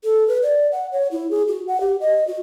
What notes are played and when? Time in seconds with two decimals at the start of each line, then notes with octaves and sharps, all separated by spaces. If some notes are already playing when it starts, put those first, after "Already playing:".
0.04 A4
0.28 B4
0.43 D5
0.72 F#5
0.92 C#5
1.12 E4
1.31 G#4
1.48 F#4
1.67 F#5
1.81 G4
2.01 D#5
2.27 F#4